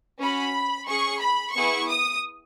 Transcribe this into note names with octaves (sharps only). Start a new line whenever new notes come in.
C#4 F#4 B5
C#4 G#4 C#6
B5
B3 E4 G#4 C#6
D#6